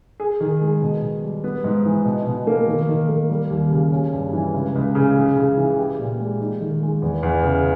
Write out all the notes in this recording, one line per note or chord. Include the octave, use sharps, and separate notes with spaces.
G#4
D#3
G#3
B2
B2
G3
B3
G#2
E3
B2
B2
A#3
D#3
D#3
A#3
G3
D#2
C#3
C#4
G2
E3
C#2
C#2
C#3
C#3
C#3
E3
G4
A#2
G#3
D#4
D#3
G#3
E2
E2
C#3